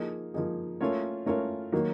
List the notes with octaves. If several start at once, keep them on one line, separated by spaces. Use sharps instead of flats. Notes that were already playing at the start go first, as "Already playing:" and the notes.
Already playing: F3 A#3 D#4 G#4
F3 A#3 D#4 G#4
A3 C#4 F4 A#4 C#5
A3 C#4 F4 A#4 C#5
D#3 F#3 A#3